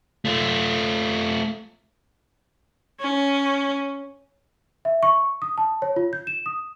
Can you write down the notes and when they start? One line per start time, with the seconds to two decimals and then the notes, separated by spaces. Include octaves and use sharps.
0.25 A3 F4
3.00 C#4
4.85 E5
5.03 C#6
5.42 D#6
5.58 A5
5.82 C#5
5.96 F4
6.13 G6
6.27 E7
6.46 D#6